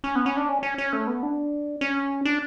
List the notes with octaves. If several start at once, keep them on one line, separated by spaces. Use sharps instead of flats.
C#4
B3
C#4
D4
C#4
C#4
C#4
A3
B3
D4
C#4
D4